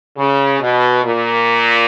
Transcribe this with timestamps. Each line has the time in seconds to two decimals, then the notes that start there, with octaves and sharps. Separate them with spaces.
0.17 C#3
0.60 B2
1.03 A#2